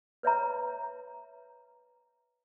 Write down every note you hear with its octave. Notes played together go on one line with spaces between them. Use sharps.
B4 C#5 E5 A#5